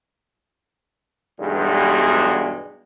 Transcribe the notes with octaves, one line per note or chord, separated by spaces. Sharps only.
B1 E2 G2 B2 G3 G#3